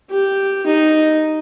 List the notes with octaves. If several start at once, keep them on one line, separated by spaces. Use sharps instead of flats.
G4
D#4